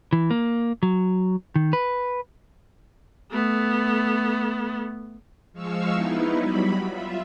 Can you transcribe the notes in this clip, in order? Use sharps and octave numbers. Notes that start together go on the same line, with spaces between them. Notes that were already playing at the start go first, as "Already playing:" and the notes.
E3
A#3
F#3
D#3
B4
A3 B3
F3 G#3 F5 C#6 E6
B3 D#4 E4
F#3 G3 B5
F4 E5